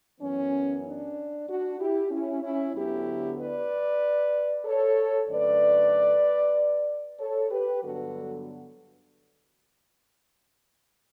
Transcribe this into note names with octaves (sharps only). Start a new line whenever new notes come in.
F#2 E3 B3 C#4
D4
D4 F#4
E4 G4
C#4 E4
C#4 E4
D2 D3 F#3 B3 E4 G4
B4 D5
A4 C#5
F#2 D3 A3 B4 D5
A4 C#5
G4 B4
G2 D3 F#3 B3 F#4 A4